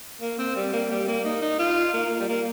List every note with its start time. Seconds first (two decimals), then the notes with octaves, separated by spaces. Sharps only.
0.21 A#3
0.39 C4
0.56 G3
0.73 A#3
0.91 G3
1.08 A#3
1.25 D#4
1.42 D#4
1.59 F4
1.94 A#3
2.20 G3
2.29 A#3